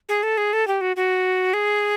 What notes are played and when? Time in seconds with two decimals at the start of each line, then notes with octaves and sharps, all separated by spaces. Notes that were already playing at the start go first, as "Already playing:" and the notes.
0.09 G#4
0.23 A4
0.37 G#4
0.53 A4
0.68 G4
0.81 F#4
0.96 F#4
1.54 G#4